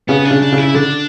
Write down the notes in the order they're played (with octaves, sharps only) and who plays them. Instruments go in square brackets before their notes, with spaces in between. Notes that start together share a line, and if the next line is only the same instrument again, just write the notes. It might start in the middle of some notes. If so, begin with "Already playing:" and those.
[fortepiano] C#3 [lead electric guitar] B3
[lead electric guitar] D4
[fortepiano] C#3
[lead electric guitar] D4
[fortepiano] C#3
[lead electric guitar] E4
[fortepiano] D3 [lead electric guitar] D4